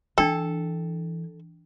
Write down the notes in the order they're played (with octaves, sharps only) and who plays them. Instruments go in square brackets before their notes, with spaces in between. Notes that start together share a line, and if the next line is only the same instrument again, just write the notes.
[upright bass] E3 [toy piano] D4 G5 [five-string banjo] A4